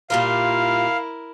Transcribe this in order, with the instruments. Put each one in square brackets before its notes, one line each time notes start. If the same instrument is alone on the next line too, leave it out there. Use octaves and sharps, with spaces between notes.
[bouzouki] A#2 G3 F4 [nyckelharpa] E4 A#4 [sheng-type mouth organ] F5